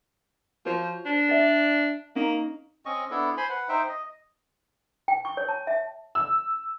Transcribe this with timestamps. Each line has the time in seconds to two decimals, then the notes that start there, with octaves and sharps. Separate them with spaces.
0.66 F3 F#4 C5 C#5
1.06 D4
1.29 D5 E5
2.16 A#3 C#4 D#4 F5
2.86 C4 C#4 D#5 C#6
3.11 B3 D4 E4 A4
3.37 C5 G#5 B5 C6
3.49 B4 F#5
3.69 D#4 C5 E5 G5
3.89 D#5
5.08 G5
5.25 C#6
5.37 C#5
5.49 A5
5.67 E5
6.15 E6